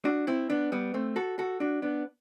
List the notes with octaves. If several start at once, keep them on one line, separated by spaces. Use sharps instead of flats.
D4 F#4
C4 E4
B3 D4
G3 B3
A3 C4
F#4 A4
F#4 A4
D4 F#4
B3 D4